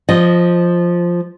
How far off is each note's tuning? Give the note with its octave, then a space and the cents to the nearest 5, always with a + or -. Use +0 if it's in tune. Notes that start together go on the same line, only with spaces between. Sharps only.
F3 +0 D#5 -10